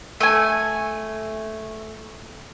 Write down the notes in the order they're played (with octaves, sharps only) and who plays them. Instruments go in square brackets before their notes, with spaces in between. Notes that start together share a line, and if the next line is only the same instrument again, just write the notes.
[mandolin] A3 G#5